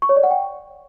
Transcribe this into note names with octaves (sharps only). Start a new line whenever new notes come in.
C#6
C#5
D5
F#5
G5